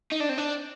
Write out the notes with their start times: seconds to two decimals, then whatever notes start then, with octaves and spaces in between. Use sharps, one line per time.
0.12 D#4
0.21 D4
0.29 C4
0.38 D4